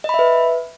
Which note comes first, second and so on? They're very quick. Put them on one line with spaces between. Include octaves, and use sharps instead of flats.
D#5 B5 E5 B4